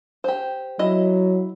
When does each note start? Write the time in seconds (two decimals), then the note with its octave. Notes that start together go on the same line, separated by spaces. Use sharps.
0.24 G4 C5
0.79 F#3 E4 D#5